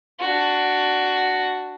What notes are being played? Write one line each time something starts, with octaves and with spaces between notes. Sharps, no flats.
D4 F#4